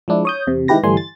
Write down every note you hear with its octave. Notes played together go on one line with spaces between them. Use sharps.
F3 G#3 D4 E4
C#5 D#6 G6
E2 C3
D#3 G#3 E4 G4 B4 A#6
G1 E3 G3 A3 G#5 C6
A6